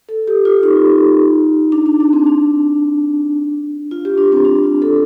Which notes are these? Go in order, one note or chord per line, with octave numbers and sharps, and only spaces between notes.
A4
G4
F4
D#4
D4
D4
D4
C4
D4
F4
G4
D4
C4
D4
F4
A4